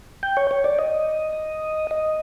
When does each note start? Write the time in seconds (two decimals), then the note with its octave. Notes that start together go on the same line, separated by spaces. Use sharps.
0.23 G5
0.37 C#5
0.51 C#5
0.64 D5
0.79 D#5
1.91 D#5